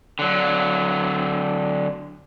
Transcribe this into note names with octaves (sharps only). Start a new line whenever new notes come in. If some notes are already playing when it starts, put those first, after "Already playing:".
D3 F#3